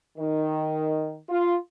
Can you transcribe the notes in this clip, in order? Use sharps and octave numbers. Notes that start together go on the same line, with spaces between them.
D#3
F4